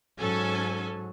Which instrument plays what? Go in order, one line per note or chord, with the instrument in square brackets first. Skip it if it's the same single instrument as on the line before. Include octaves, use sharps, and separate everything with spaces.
[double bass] G#2 F#3 [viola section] C#4 A4 G#5